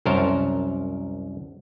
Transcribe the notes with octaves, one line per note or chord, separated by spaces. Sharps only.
C2 F#2 A#4 C5 C#5 A5